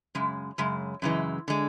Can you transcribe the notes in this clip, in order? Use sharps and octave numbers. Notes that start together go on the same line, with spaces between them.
F#2 C#3 G#3
F#2 C#3 G#3
F#2 C#3 E3 G#3
D3 G#3